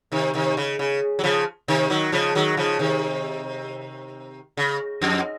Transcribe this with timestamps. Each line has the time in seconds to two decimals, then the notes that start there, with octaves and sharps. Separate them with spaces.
0.12 C3 D#3
0.34 C3 D#3
0.57 C#3
0.79 C#3
1.19 F#3
1.23 C#3 F3
1.68 C3 D#3
1.90 D#3 F#3
2.12 C#3 F3
2.35 D#3 F#3
2.57 C#3 F3
2.79 C3 D#3
4.57 C#3
5.02 F2